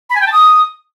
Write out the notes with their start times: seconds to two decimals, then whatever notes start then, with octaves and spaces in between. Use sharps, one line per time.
0.10 B5
0.15 G#5
0.21 G5
0.26 A5
0.32 D#6